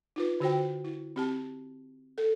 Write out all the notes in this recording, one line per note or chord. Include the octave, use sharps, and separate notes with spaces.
D#4 F4 B4
D3 F#4 C5 G5
E4
C4 G4 A5
A4